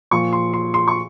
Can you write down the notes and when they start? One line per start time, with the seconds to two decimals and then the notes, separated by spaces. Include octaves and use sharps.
0.11 A#2 F3 C#6
0.33 C6
0.53 C6
0.74 C6
0.88 C#6